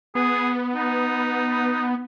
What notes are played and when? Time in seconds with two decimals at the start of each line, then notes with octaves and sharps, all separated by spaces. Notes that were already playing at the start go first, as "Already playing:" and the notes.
0.15 B3 G#4
0.75 D#4